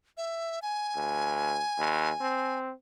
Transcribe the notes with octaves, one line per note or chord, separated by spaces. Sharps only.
E5
G#5
D2
D#2
C4